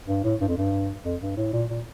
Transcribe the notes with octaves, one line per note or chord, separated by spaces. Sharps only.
G2
A2
G2
F2
G2
F2
G2
A2
A#2
A#2